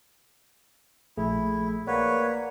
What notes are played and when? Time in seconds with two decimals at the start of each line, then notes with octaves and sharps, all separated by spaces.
1.18 A#1 A3 E4 G#4
1.87 A#3 B4 C#5 D5 F#5